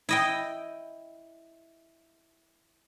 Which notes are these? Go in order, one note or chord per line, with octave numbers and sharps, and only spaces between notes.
E4 D#5 G5